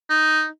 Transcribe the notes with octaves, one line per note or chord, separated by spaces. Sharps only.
D#4